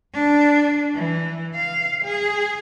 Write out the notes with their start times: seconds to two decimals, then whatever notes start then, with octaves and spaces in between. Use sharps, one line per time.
0.14 D4
0.94 E3
1.54 F5
2.04 G#4